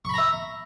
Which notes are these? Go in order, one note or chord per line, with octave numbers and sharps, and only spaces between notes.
E5 A#5 B5 C#6